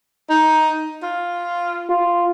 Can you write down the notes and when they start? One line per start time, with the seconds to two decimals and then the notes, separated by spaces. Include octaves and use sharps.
0.30 D#4
1.02 F4
1.89 F4